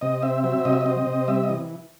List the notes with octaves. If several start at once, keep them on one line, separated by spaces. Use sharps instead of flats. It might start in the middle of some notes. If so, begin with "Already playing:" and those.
C3 D#5
C4 E5
F#3 E5
C3 D#5
E5
D#5
C4
C3
G3 E5
D#5
E3